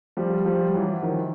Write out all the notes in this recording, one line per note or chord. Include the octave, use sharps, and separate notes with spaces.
F3 G3
F3 G3
E3 F#3
D#3 F3